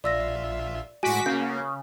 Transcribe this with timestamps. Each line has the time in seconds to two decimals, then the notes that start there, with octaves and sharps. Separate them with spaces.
0.04 A#1 F4 D5 E5 E6 A#6
1.03 A2 G#3 F#4 G#5 D6 B6
1.26 C#3 A#3 G6